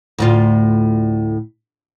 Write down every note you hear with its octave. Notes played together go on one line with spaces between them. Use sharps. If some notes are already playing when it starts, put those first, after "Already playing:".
D2 A2 F4